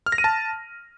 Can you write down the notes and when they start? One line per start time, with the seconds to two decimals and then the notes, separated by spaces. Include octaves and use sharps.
0.06 F6
0.12 A#6
0.18 D#7
0.24 A5